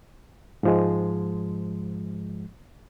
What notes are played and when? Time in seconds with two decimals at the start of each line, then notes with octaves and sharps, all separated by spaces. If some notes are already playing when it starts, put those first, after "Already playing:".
0.63 G#2 F3 G#3